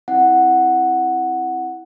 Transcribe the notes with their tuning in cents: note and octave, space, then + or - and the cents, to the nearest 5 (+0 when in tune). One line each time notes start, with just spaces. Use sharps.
C4 +0 E4 +0 F#5 +0